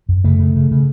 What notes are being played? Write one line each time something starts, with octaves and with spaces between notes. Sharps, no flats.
F#2
C#3 A3
C#3
C#3
C#3